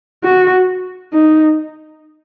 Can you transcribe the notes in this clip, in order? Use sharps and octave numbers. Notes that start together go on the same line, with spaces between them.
F#4
D#4